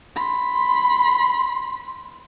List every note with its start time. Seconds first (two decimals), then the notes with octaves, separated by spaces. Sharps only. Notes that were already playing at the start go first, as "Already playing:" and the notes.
0.16 B5 C6